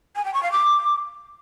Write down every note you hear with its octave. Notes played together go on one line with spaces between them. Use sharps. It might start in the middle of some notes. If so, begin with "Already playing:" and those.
G#5
G5
C#6
F5
D6